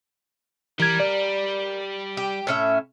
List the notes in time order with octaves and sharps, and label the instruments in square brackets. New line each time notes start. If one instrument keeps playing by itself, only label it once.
[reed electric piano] E3 G#6 [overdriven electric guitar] G3 [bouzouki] A#4
[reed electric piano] D5
[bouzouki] G4
A2 C#4 E5